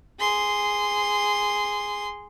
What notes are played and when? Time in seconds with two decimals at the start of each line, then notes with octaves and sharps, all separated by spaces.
0.20 G#4 C6